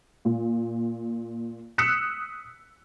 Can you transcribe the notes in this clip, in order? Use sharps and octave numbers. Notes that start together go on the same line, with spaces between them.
A#2
D#6 E6 F#6 B6 C#7 E7